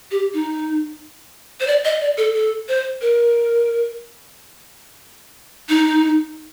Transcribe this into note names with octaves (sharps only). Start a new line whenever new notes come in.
G4
D#4
C5
D5
D#5
D5
A4
A4
C5
A#4
D#4